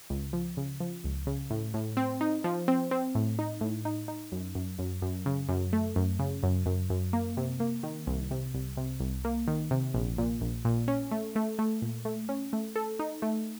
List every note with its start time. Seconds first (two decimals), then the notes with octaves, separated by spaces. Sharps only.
0.10 C#2
0.33 F3
0.57 C#3
0.80 F3
1.04 C#2
1.27 C#3
1.50 A2
1.74 A2
1.97 C4
2.21 D#4
2.44 F3
2.68 C4
2.91 C4
3.15 A2
3.39 D#4
3.61 A2
3.85 D#4
4.08 D#4
4.32 F#2
4.55 F#2
4.79 F#2
5.02 F#2
5.26 C#3
5.49 F#2
5.73 A3
5.96 F#2
6.19 C#3
6.43 F#2
6.66 F#2
6.90 F#2
7.13 A#3
7.37 C3
7.60 A#3
7.83 D#3
8.07 C2
8.31 C3
8.54 C2
8.77 C3
9.00 C2
9.25 A#3
9.48 D#3
9.71 C3
9.94 A#1
10.18 A#2
10.41 A#1
10.65 A#2
10.88 C#4
11.11 A3
11.36 A3
11.59 A3
11.82 A#2
12.05 A3
12.29 C#4
12.53 A3
12.76 A4
12.99 D#4
13.22 A3